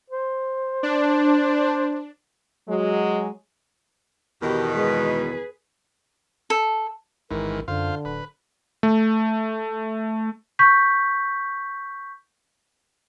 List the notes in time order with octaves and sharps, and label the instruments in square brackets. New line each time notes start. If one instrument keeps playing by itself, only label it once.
[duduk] C5
[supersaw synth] D4
[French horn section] F#3 G#3
[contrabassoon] E2 [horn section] B2 D#3 [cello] G4
[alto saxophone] G#3 [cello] G#4 B4
[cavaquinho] A4
[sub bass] A1 [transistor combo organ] G#2 D#3 E3 [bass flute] A#4
[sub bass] F#2 [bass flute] D3 [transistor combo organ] F4 C5 F5
[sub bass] D1 [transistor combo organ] B4
[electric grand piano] A3
[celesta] C#6 G6 B6